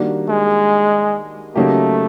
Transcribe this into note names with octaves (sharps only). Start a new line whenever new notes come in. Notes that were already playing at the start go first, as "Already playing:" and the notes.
Already playing: D#3 G3 A#3 D4 F#4
G#3
C#3 F#3 A3 A#3 D#4 G4